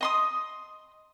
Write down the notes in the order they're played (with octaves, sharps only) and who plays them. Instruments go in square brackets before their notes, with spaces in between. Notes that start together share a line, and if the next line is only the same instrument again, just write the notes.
[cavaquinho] D#5 C6 D#6